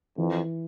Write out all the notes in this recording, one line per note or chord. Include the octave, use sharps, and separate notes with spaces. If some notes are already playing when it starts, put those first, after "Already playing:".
F2 E3